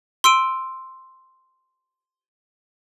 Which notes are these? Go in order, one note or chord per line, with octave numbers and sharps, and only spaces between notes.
C6 E6 D7 D#7